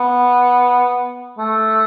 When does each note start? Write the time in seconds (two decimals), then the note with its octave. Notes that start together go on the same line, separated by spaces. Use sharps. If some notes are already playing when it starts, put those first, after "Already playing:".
Already playing: B3
1.38 A3